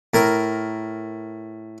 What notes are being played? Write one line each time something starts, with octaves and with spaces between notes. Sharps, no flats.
A2 A#4